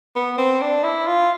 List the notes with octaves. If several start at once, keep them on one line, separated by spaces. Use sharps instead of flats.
B3
C4
D4
E4
F4